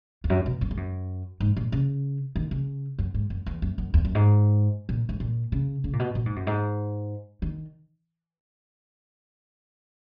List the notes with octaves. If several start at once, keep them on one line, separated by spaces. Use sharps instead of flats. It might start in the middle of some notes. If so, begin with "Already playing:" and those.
E2
F#2
B2
F#2
G#2
F#2
G#2
A#2
C#3
D#3
C#3
F#2
G#2
F#2
E2
F#2
F#2
E2
F#2
G#2
A#2
G#2
A#2
C#3
C#3
A#2
B2
A#2
G#2
F#2
G#2
D#3